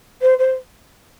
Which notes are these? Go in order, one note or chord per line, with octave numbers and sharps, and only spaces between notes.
C5
C5